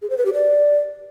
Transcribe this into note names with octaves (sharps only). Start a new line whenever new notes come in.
G#4
C5
B4
G4
D5